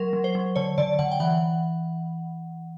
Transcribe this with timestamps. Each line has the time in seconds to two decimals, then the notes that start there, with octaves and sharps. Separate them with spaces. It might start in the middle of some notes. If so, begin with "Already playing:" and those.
Already playing: F#3 A#4
0.13 F#3
0.24 C5
0.35 F#3
0.56 D3 C#5
0.78 D3 D5
0.99 D3 F#5
1.11 G5
1.20 E3 F#5